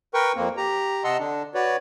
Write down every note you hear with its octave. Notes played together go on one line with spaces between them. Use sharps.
A#4 B4 G5 C#6
F2 A#3 C4
G4 A#5
C3 D#5 F#5 A5 C6 E6
D3 D4
F#4 B4 C#5 D5